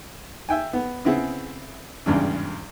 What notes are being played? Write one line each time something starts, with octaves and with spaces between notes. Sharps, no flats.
E5 G5 G#5
B3
C#3 B3 C4 E4 G#4
G#1 E2 G2 C#3